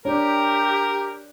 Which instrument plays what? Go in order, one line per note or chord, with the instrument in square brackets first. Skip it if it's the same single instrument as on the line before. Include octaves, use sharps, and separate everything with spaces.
[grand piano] D4 C#5 [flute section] G4 [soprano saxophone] A#4